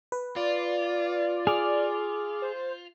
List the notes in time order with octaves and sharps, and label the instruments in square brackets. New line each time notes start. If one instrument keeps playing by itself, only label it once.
[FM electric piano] B4
[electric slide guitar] F4 [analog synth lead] D5
[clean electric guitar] G#4 [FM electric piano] D6 F6
[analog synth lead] C5